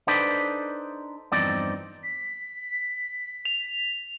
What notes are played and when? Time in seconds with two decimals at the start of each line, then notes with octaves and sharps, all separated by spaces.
0.07 D4 D#4 A4 B4 C5 D5
1.32 E2 G2 F3 C4 D#4 D5
2.04 B6
3.45 F7